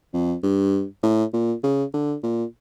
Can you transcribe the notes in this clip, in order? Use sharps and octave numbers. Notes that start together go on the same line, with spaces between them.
F2
G2
A2
A#2
C#3
D3
A#2